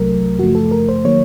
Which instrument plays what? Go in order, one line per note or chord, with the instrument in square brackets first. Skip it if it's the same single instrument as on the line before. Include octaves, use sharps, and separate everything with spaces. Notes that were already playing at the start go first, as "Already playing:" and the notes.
Already playing: [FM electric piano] C2 C3 F#3 A3 A#4
F#2 C#3 F3 A3 F#4
A4
A#4
C5
D#3 F#3 A#3 C#5